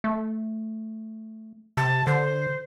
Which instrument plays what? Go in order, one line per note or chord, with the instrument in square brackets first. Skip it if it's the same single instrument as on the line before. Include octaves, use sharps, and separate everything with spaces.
[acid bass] A3
[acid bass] C3 [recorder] A5
[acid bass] D3 [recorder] C5